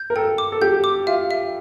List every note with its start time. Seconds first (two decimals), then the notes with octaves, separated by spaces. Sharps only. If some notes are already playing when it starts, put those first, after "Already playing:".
Already playing: G6
0.10 A#4
0.16 A4 G5
0.38 D6
0.52 A4
0.62 G4 G6
0.84 D6
1.07 F4 E5
1.31 E5